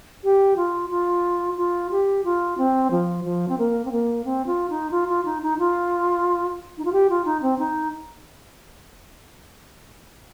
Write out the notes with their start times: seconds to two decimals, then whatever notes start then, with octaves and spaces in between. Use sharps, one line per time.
0.24 G4
0.56 F4
0.90 F4
1.57 F4
1.91 G4
2.25 F4
2.58 C4
2.91 F3
3.25 F3
3.49 C4
3.58 A#3
3.85 C4
3.92 A#3
4.25 C4
4.46 F4
4.70 D#4
4.91 F4
5.08 F4
5.25 D#4
5.42 D#4
5.59 F4
6.78 D#4
6.85 F4
6.92 G4
7.10 F4
7.25 D#4
7.42 C4
7.59 D#4